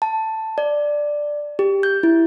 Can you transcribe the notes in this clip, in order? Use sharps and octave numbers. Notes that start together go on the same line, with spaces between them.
A5
D5
G4
G6
E4